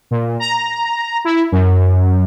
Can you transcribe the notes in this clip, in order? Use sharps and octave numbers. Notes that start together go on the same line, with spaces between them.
A#2
A#5
E4
F#2